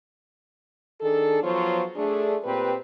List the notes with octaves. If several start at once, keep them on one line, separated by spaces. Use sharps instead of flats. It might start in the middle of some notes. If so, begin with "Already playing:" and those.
D#3 D4 G#4 A4
F3 F#3 B3 F4 C5 C#5
A3 D4 G#4
A#2 C4 G4 B4